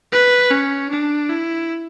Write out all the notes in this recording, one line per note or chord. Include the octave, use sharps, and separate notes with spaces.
B4
C#4
D4
E4